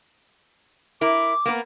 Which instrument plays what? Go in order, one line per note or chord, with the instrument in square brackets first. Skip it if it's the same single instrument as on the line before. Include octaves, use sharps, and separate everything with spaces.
[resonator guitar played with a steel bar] E4 A#4 [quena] D6
[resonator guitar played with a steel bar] A#3 B3 A#4